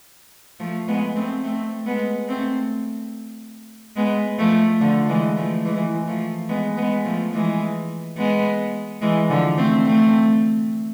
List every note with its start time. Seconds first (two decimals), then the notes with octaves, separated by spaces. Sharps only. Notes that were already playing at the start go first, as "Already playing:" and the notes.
0.60 F3 A3
0.88 G#3 B3
1.16 A3 C4
1.44 A3 C4
1.86 G#3 B3
2.28 A3 C4
3.96 G#3 B3
4.39 F3 A3
4.81 D3 F3
5.09 E3 G#3
5.37 F3 A3
5.65 E3 G#3
6.07 F3 A3
6.49 G#3 B3
6.77 G#3 B3
7.05 F3 A3
7.33 E3 G#3
8.17 G#3 B3
9.02 E3 G#3
9.30 D3 F3
9.58 A3 C4
9.86 A3 C4